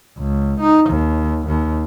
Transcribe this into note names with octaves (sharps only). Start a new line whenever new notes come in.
C#2
D#4
D#2
D#2